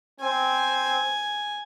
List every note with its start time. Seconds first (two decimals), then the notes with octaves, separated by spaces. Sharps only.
0.20 C4 G#5